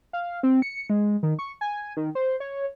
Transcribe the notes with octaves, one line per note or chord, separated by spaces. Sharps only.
F5
C4
C#7
G#3
D#3
C#6
G#5
D#3
C5
C#5